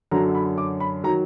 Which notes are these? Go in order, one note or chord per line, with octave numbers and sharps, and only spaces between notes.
F#2 D3 F#3 A#5
B5
D6
B5
D#3 F#3 A#5